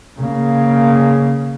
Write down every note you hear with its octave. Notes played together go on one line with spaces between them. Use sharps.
C#3 A#3